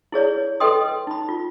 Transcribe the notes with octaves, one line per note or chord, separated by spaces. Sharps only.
E4 G#4 C#5 D5
A4 B4 D#5 G5 C6 D#6
D#4 B5
F4